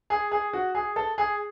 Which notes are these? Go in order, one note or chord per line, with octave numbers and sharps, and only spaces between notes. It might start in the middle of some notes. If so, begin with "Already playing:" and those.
G#4
G#4
F#4
G#4
A4
G#4